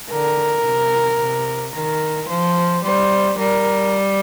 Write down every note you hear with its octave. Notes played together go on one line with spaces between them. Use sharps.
D3 A#4
C3
C3
D#3 A#4
F3 C5
G3 C5
G3 A#4